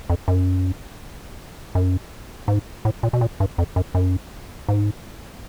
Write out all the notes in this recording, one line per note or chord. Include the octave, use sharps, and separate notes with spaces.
F2
F#2
F#2
G#2
A2
A#2
B2
A#2
G2
F2
F#2
F#2
G#2